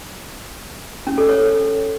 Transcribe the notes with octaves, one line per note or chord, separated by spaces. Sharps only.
C#4
A4
C#5